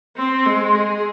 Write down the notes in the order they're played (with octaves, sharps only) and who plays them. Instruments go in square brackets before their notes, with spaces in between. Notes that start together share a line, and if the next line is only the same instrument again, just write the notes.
[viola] C4 [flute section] C6
[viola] G#3
G#4